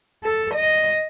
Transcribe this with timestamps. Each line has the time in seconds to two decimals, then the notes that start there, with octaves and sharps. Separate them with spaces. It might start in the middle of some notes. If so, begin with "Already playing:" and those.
0.23 A4
0.54 D#5